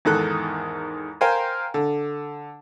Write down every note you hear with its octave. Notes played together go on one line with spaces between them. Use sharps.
E2 G#2 D#3 A4 F#6
A#4 C5 F5 G5 G#5
D3